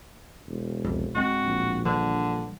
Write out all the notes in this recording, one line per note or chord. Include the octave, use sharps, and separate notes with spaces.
E1
C2 F2
D1 G#3 C4 F#4
A#1
D3 E3 G3